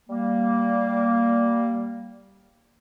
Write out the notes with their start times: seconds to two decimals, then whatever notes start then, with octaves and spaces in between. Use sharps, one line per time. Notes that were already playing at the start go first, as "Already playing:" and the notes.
0.08 G3 A#3